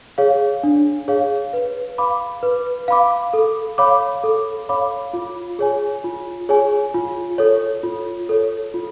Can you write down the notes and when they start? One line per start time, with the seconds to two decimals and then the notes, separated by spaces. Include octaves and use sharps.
0.18 G#4 C#5 F5
0.63 D4
1.08 G#4 C#5 F5
1.53 B4
1.98 F5 B5 D6
2.43 B4
2.88 F5 B5 D6
3.33 A4
3.78 C#5 F5 B5 D6
4.24 A4
4.69 C#5 F5 B5 D6
5.13 F4
5.59 G#4 C#5 G#5
6.04 F4
6.49 G#4 C#5 G#5
6.94 F4
7.38 A4 C#5
7.83 F4
8.29 A4 C#5
8.74 F4